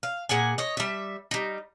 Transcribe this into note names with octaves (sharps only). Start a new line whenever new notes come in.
F5
A#2 G#4 F#5 G#5
C#5 D#5
G3 E5
G3 D#4